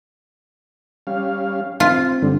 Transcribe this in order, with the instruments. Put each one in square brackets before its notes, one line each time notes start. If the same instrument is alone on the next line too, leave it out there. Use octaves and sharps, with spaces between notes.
[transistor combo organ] G3 C#4 F5
[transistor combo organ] C4 [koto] F4
[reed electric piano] G2 D3